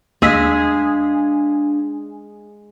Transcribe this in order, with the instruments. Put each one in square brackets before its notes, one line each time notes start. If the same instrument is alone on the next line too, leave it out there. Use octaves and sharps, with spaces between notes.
[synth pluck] D#2 E6 B6 [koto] G#3 G#4 [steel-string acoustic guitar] D4 F5